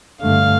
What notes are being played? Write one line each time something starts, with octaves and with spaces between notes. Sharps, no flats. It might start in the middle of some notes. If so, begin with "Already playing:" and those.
G2 D3 A3 F5